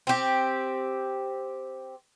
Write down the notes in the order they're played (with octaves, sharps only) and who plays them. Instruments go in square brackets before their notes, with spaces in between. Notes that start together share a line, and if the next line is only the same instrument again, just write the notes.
[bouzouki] C4 G4